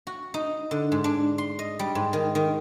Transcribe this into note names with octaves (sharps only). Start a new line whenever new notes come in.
F#4
D#4
D3
G#2
D4
C6
D#5
G3
G#2
D#3
D#3